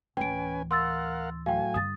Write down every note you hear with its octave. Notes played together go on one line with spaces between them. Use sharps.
D1 E3 C#4 B4 G5 G#5 D7
A#4 F5 F#5 C6 E6 A6
A2 F#3 F5 G5 G#5
G2 D3 D#6 A6